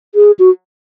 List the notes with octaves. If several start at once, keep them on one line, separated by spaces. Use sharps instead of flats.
G#4
F#4